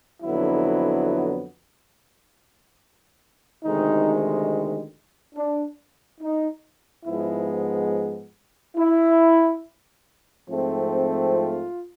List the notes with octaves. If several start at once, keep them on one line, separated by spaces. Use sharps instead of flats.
F2 D3 F#3 B3 E4
D2 C3 D#3 G#3 D#4
D4
D#4
G#2 F3 G#3 B3 E4
E4
G#2 F3 A3 C4
F4